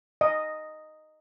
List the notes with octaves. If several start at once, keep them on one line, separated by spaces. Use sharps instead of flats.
D#5